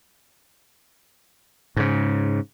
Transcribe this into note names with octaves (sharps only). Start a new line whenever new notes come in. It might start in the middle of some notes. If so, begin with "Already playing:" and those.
G#2 C#3